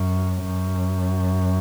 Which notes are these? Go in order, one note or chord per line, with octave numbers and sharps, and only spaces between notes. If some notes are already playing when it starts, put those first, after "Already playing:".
Already playing: F#2
F#2